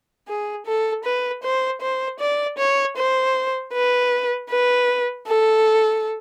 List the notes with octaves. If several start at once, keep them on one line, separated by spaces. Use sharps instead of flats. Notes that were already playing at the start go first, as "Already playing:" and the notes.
G#4
A4
B4
C5
C5
D5
C#5
C5
B4
B4
A4